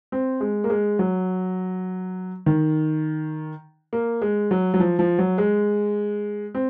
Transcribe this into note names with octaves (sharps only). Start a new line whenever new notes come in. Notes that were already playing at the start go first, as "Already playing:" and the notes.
C4
G#3
A#3
G#3
F#3
D#3
A#3
G#3
F#3
F#3
F3
F3
F#3
G#3
C4